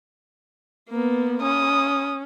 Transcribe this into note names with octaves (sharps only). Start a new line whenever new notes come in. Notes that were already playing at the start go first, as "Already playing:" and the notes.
A#3 B3
C#4 D#6